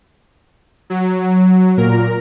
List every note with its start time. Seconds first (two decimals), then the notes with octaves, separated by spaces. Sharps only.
0.90 F#3
1.77 A#2 A#4